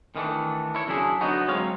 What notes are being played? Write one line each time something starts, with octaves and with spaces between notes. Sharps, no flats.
D#3 E3 A3 D4
E4 C#5
F#2 C#3 D4 E4 G#4
D3 F#3 B3 D#4 F#4
F#3 G#3 C4 C#5 F5